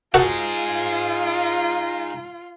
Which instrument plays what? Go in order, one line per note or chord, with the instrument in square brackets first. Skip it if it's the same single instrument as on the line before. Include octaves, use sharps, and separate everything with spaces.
[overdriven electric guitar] D#4 G#4 [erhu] F4 [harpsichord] F#4 A4